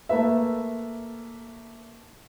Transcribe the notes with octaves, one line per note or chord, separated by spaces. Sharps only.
A3 A#3 B4 E5